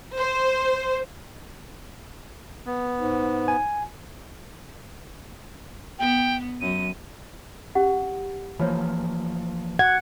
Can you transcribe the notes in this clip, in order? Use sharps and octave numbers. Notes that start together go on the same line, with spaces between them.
C5
B3
G#2
G#5
B3 G5
F#2 D#7
C#4 G4 F#5
E3 F3 A#3 F4 C5 C#5
F#5 G#6